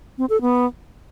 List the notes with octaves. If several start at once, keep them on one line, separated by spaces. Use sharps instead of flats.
C4
A4
B3